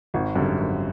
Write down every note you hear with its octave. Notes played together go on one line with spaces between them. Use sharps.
G#1 F#4
F#2 D3 G3
G#1